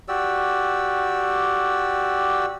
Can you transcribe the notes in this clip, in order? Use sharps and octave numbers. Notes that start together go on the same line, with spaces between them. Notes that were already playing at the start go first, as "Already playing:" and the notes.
F#4 G4 D5 E6